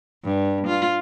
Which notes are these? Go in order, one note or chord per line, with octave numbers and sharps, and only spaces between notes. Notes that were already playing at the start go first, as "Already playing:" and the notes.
G2
F4